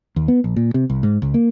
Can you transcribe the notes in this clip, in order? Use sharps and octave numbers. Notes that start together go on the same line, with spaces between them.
D#2
B3
A#1
A#2
C3
C2
G#2
C#2
A#3